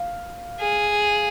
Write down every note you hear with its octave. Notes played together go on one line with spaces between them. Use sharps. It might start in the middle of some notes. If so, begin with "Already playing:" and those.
Already playing: F5
G#4